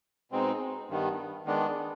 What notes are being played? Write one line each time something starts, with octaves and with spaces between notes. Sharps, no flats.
B2 G#3 C4 D#4
G2 D#3 B3
D#3 G#3 B3 D4